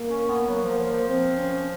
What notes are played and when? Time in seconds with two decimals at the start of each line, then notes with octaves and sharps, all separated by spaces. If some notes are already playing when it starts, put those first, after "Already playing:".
Already playing: A#3
0.09 C#4
0.29 B3
0.49 F#3
0.64 F3
0.78 F3
0.92 F3
1.08 C4
1.37 C#4